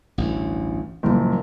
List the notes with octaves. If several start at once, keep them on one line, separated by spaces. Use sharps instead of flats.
A1 D2 G2
F#1 A#2 F3 G3 A#3